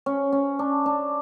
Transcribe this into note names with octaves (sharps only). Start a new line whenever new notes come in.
C#4
C#4
D4
D4